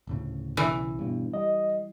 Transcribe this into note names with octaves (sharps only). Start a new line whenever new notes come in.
D1 A2 C#3
B1 C#3 E3
G2 B2
G3 D#5